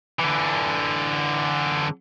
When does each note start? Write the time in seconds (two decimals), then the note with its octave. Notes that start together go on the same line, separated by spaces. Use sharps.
0.20 D3 E3